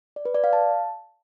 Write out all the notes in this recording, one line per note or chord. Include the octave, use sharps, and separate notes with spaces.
D5
B4
D5
F5
A5